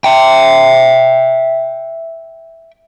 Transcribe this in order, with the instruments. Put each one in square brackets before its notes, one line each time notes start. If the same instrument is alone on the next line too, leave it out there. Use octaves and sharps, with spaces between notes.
[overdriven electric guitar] E5 G5